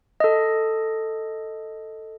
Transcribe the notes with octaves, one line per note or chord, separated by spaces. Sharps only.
A4 D#5